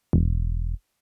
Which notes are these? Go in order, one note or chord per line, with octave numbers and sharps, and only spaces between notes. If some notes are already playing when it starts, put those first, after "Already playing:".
E1